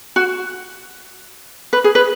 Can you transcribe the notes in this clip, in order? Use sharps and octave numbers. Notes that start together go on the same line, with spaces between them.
F#4
B4
G#4
B4